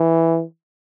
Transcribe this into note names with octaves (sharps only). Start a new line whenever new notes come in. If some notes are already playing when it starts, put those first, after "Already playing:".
Already playing: E3